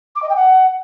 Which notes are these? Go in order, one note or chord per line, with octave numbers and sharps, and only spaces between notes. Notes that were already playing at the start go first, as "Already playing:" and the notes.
D6
D#5
G5
F#5